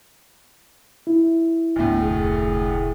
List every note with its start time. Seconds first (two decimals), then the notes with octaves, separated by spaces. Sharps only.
1.07 E4
1.76 D2 A2 A3 B3
2.02 F1 G#4